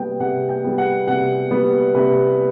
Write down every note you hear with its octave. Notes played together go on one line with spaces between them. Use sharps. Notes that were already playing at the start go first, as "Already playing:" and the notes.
Already playing: C3 G3 B3 G5
C3 F#5
G5
G3 B3
F#5
C3 F#5
G3 B3
C3 B4